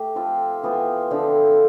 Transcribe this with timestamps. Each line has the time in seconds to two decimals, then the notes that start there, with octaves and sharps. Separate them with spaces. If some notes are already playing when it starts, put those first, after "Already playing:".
Already playing: A3 G4
0.16 F3 C4 F4
0.63 E3 B3 F4 C5
1.11 D3 F3 C4